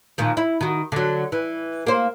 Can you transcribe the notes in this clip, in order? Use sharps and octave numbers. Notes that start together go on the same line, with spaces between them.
A#2 D#3 F3
E4
D#3 F#4
D3 F#3
E3
A#3 C5